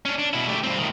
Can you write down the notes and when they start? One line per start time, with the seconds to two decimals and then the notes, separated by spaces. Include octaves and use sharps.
0.05 C#4 D4
0.18 D4
0.33 B2 E4
0.48 A3 G4
0.63 G2 C4
0.78 A2 D#3